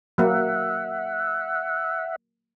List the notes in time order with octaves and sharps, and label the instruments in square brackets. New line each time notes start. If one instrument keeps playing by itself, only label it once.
[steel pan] F#3 A#3 [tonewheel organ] E5 F#5